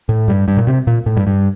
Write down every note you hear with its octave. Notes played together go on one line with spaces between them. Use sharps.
A2
G2
G2
A#2
C3
A#2
A2
G2
G2